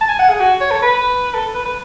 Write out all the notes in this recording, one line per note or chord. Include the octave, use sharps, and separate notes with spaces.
A5
G#5
F#5
G#4
F#4
C#5
A4
B4
A4
B4
B4